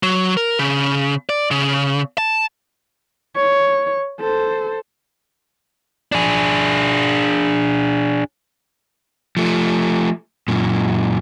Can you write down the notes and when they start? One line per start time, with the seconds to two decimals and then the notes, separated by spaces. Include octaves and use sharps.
0.03 F#3
0.37 A#4
0.59 C#3
1.29 D5
1.51 C#3
2.18 A5
3.35 C#5
4.20 A4 C5
6.12 D4 G#4
9.37 F3 A3
10.48 F#2 A#2